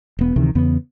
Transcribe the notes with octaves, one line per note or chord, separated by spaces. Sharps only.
E1 B3
D2 C3 D#3 E3
E2 C#3 B3